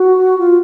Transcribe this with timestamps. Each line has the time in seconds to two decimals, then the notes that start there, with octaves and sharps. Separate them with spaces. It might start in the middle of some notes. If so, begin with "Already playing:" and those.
Already playing: F#4
0.39 F4